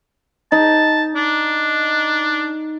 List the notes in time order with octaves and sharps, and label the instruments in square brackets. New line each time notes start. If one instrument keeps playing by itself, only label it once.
[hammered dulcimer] D#4 [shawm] A5
[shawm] D4